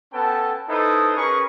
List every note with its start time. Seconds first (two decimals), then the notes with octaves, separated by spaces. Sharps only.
0.13 B3 C#4 A4 B4 G5 A5
0.69 D#4 E4 A4 B4 C5 D#6
1.17 C#4 G#4 A#4 B4 C#6